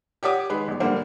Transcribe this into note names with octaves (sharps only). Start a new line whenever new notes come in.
G4 C#5 F#5 D6 D#6
D#3 G#3 B4
G1
G#2 D3 G3 A#3 C5 F#5